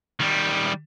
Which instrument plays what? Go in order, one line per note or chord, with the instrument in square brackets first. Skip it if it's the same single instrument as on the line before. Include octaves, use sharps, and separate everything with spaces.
[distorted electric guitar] D#3 G3